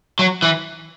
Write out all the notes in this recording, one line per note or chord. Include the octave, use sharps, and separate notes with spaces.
F#3
E3